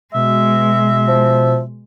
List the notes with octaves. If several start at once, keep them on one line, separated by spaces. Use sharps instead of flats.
B2 G#3 E5
F3